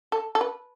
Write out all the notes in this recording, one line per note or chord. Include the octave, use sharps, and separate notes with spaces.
A4
A4
B4